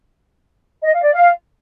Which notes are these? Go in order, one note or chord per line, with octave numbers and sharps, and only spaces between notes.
D#5
F5
D5
F5